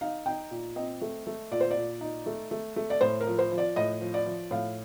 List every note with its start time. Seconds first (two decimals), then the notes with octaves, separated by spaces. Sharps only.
0.01 D#4 F5
0.26 D#4 G5
0.51 A#2
0.76 C4 D#5
1.01 A3
1.27 A3
1.51 A#2 D5
1.61 C5
1.71 D5
1.76 A#2
2.01 D#4
2.26 A3
2.51 A3
2.76 A3
2.90 D5
3.01 A2 C5
3.20 A#4
3.27 F3
3.39 C5
3.52 F3
3.58 D5
3.76 A2 D#5
4.01 F3
4.14 D5
4.26 F3
4.51 A2 F5